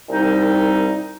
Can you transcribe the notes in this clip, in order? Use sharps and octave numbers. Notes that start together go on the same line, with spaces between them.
C2 A#2 G3 C4 D#4